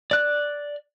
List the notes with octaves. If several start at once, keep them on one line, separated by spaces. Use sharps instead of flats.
D5 F#6